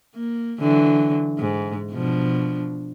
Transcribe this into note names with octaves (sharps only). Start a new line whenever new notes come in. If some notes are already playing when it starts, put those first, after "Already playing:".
A#3
D3 E3 F#3
G#2
B2 F3 D4